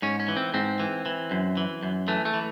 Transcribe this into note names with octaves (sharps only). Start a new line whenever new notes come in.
G#2 C#4
C#4
E3
C4
G#2 C4
E3
E3
F#2
E3
F#2
E3 A3
A3
E3